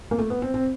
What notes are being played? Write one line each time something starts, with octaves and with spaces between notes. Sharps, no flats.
A#3
A3
B3
C4
C4